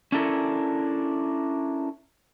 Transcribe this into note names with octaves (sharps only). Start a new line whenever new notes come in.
C#4 D4 E4 A4 A#4